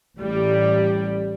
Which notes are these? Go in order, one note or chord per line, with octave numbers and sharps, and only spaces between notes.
A1 A2 G3